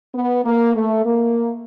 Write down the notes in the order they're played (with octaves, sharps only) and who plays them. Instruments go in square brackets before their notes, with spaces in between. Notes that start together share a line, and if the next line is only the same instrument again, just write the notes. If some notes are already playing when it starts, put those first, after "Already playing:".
[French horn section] B3
A#3
A3
A#3